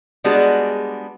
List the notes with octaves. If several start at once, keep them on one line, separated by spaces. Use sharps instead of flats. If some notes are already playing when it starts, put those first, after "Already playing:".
G3 G#3 B3 D4 F#4 G#4